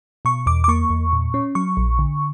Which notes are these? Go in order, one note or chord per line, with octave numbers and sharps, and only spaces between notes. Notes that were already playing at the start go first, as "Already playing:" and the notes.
B2 C#6
E2 D6
D6
A#3 C#6
E2
A#2
C#4
F#3 C#6
A#1
D3